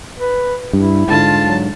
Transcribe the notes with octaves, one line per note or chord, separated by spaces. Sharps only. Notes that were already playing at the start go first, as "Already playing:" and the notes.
B4
G2 E4
G#2 D3 F4 A5
F#3